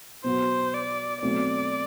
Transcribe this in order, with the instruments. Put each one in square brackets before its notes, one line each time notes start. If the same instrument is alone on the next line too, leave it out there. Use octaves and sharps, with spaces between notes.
[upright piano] B2 F#3 B3 F#4 [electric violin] C5
[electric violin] D5
[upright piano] B2 F#3 A3 C4 [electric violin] D5